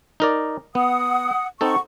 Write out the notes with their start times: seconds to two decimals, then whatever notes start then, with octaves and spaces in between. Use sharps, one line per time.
0.20 D#4 A#4 D5
0.75 B3 F#5 D#6
1.61 C4 D#4 A4 F#5 C#6